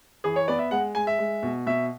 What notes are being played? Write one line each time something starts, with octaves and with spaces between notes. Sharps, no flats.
E3 G#4
C#5
B3 D5
E5
G#3 F#5
G#3 G#5
E5
G#3
B2
B2 E5